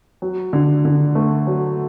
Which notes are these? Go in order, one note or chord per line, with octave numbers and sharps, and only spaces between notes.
F#3
D3
D3
A3
F#3